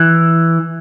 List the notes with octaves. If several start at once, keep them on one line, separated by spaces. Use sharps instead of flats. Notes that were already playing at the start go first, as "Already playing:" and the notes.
Already playing: E3